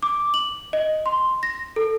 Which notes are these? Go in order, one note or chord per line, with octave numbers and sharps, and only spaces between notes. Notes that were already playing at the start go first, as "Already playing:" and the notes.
D6
F#7
D#5
C6
A#6
A4